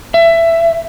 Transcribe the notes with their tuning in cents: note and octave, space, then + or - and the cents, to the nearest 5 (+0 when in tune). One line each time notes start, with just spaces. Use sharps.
E5 +15